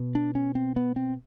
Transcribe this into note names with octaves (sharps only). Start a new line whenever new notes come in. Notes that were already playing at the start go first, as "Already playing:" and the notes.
Already playing: B2
D4
C#4
C4
B3
C4